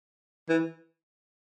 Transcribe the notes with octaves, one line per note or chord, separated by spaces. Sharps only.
E3